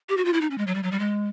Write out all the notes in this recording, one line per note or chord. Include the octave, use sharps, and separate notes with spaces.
G4
F#4
F4
E4
D#4
C#4
G#3
F#3
G3
F#3
G3
G#3